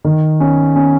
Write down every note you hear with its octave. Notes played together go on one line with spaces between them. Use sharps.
D#3
C#4
C#4